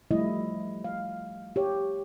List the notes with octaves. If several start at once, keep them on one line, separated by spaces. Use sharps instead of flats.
F3 G3 A3 E4 D#5
F5
G4 C#5